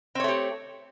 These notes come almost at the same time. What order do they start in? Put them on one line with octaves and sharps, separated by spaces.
C4 C#5 A3 G4